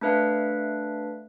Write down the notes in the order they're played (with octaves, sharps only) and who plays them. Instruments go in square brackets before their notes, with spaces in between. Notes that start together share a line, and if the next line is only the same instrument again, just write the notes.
[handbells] A3 D4 B4 E5 F5